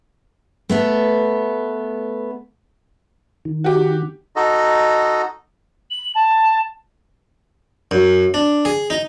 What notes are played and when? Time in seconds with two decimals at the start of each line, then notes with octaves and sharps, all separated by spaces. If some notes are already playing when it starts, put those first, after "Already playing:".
0.70 A3 B3 A4
3.45 D#3
3.64 F#4 G4
4.36 D#4 F#4 A4 D#5
5.90 F#7
6.15 A5
7.91 F#2
8.34 D4
8.65 G#4
8.90 D#4